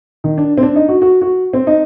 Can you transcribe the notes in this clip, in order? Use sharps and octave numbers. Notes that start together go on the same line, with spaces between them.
D#3
D4
C4
D4
D#4
F#4
F#4
F#4
C4
D#4